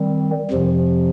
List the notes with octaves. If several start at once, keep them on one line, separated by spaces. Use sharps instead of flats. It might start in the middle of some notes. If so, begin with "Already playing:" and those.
Already playing: D#3 G3 C4
F2 C3 F3